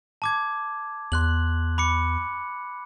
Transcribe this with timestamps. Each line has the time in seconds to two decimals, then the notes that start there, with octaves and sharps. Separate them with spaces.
0.22 A5 D6 G#6
1.12 E2 C6 F#6 F#7
1.78 B5 D6 C#7